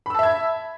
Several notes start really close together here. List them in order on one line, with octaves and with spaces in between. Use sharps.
B5 E6 A5 E5 G#6